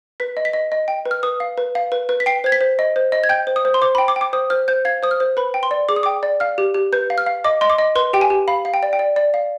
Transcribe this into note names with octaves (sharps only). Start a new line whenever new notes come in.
B4 B6
D#5
B6
D#5
D#5
G5
B4
F6
B4 D#6
F5
B4
F5
B4
B4
B6
G5 C7
C5 G#6
B6
C5
D#5
C5
D#5
G#6
G5 G6
C5
D#6
C5
C6
C5 D6
B5
G5
D6
G5
D6
C5 D#6
C5 F6
C5 G6
F5 G#6
C5 D#6
F6
C5
B4 B5
G5
C6
D5
G#4 D6
D#6
D6
G5
D5
F5 F6
G4
G4
B4 G6
F5
F6
F5
D#5 D6
D#5 C6
D6
D#5
B4 C6
G4 G5
G#5
G4
F5 B5
F5
G5
D5
G5
D5
D5
F5